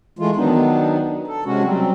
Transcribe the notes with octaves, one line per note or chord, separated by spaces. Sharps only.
E3 G#3 A3 F4
D#3 F#3 B3 D4 D#4
A4
C3 G#3 C#4 F#4
F#3 G3 C4